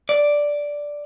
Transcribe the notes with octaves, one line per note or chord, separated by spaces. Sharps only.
D5